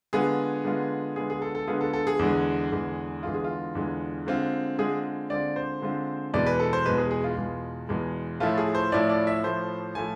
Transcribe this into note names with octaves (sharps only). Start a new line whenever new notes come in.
D3 G#3 B3 F4 G#4
D3 G#3 B3 F4
D3 G#3 B3 F4 G#4
G#4
A4
A4
D3 G#3 B3 F4 G#4
A4
A4
G#4
E2 D3 G#3
E2 D3 G#3
E2 D3 G#3 F4
G#4
F4
E2 D3 G#3
D3 G#3 C4 F4
D3 G#3 C4 F4 G#4
D3 G#3 C4 F4 D5
C5
D3 G#3 C4 F4
E2 B2 G#3 D5
B4
A4
C5
E2 B2 G#3 B4
G#4
G#4
F4
E2 B2 G#3
E2 B2 G#3
A2 F3 A3 E4 F4
G#4
C5
A2 F3 A3 E4 D5
D5
E5
A2 F3 A3 E4 C5
A2 F3 A3 E4 G#5